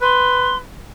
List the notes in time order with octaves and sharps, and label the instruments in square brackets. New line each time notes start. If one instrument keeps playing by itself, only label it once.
[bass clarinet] B4 [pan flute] C6